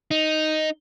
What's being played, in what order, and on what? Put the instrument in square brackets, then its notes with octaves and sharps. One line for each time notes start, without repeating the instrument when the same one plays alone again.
[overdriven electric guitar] D#4